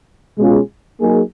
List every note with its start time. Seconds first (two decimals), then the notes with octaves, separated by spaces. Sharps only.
0.39 B2 G#3 C#4 F4 G#4
1.00 F#3 A#3 D#4 G#4